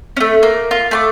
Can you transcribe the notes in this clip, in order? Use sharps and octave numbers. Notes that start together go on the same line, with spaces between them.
A3 C#4
A#3
F4
A3 C6 D6